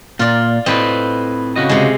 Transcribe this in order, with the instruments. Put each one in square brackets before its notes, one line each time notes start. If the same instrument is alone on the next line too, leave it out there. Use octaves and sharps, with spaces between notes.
[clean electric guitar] A#2 [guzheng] F4 D5
[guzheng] A2 C4 [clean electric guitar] B4 D#5
[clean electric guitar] C#3 F#4 D#5
[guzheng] C3 G#3